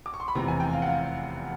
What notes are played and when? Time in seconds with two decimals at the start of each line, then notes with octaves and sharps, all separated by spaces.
0.06 D6
0.14 C#6
0.20 C6
0.28 B5
0.35 F1 E2 C3 E3 A#5
0.48 G#5
0.60 G5
0.73 F5
0.82 F#5
0.86 F5